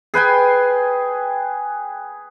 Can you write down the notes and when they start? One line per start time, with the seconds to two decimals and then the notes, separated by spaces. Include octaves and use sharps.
0.14 G#4 B4 G5 G#5